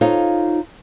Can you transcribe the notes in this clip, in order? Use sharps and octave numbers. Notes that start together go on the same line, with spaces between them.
D#4 F4 A4 C5 C#5 F5